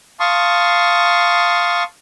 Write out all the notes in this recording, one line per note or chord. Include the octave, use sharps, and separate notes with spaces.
F5 A5 C6 C#6 D#6